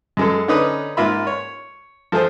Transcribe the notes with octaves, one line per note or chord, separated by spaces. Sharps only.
F#2 G#3 A4
D3 C#4 D#4 B4 D#6 F#6
G#2 A#3 F4 E5 B5
C#5
F3 A3 G#4 C5